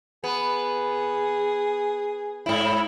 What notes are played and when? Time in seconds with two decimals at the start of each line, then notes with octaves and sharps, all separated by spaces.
0.24 B3 G#4
2.46 G#2 E4